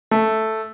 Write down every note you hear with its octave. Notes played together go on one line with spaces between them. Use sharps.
A3